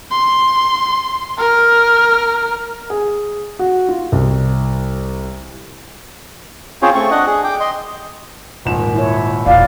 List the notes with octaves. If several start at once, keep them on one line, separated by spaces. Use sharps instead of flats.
C6
A#4 F6
G#4
F#4
F4
C2
C4 C#4 F4 G#4 C5 C#5
A3 C4 C#6
D4 D#5 F#5
G#4
G5 D6
D#5 C6
D#1 G#1 E7
E4 C#5
E1 A#2 C4 D5 F5